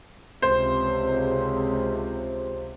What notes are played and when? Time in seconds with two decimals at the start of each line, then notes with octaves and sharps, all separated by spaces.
0.42 C#2 C3 C5